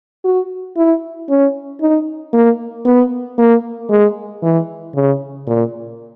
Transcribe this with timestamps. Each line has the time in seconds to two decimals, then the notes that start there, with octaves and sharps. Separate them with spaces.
0.25 F#4
0.77 E4
1.29 C#4
1.81 D#4
2.33 A#3
2.86 B3
3.38 A#3
3.90 G#3
4.43 E3
4.95 C#3
5.47 A#2